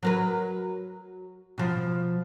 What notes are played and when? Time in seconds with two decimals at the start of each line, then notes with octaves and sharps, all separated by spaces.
0.03 F#3 A#4 B4
1.58 B2 F3